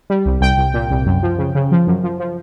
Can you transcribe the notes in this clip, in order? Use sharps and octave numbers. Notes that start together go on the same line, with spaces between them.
G3
C2
C2 G5
C2
A#2
C2
F#2
F3
C#3
C#3
F3
F#2
F3
F3